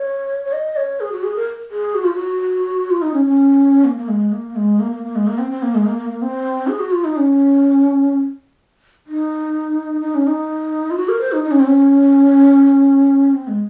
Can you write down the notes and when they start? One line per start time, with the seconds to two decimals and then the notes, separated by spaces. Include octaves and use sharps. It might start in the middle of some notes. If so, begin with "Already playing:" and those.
Already playing: C#5
0.45 C#5
0.53 D#5
0.76 C#5
1.00 G#4
1.12 F#4
1.23 G#4
1.36 A#4
1.71 G#4
1.95 F#4
2.04 F4
2.14 F#4
2.90 F4
3.02 D#4
3.13 C#4
3.26 C#4
3.85 A#3
3.97 A#3
4.08 G#3
4.32 A#3
4.56 G#3
4.80 A#3
4.92 A#3
5.03 A#3
5.16 G#3
5.27 A#3
5.39 C4
5.51 C4
5.63 A#3
5.75 G#3
5.86 A#3
5.98 A#3
6.10 A#3
6.22 C4
6.68 G#4
6.80 F#4
6.92 F4
7.05 D#4
7.17 C#4
9.07 D#4
10.01 D#4
10.15 C#4
10.27 D#4
10.91 F4
10.97 F#4
11.09 A#4
11.21 C5
11.32 D#4
11.44 D#4
11.51 C#4
11.60 C4
11.67 C#4
13.34 C4
13.48 G#3